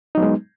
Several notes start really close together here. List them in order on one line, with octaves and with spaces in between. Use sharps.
D#4 F#3 B3 G#3